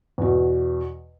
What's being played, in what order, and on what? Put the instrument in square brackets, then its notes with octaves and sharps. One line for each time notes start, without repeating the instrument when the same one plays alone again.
[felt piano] E2 B2